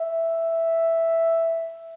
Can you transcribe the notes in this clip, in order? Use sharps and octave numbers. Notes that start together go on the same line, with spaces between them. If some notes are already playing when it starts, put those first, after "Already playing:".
Already playing: E5